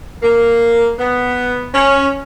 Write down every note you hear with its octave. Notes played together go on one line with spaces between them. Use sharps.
A#3
B3
C#4